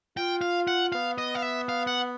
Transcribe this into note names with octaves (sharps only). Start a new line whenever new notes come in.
F4 G5
F5
F#5
B3 F5
D#5
F5
E5
F5
F#5